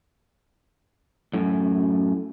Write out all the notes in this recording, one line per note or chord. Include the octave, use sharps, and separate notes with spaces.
F#2 A2